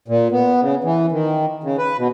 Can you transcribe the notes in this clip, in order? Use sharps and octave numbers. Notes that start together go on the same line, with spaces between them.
A#2
B3
C#3
E3
D#3
C#3
B4
B2